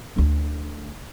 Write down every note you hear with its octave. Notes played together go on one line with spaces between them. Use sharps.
D2 D4